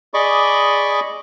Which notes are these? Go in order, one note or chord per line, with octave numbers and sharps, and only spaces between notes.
G#4 D5 D#5 B5 C#6 D6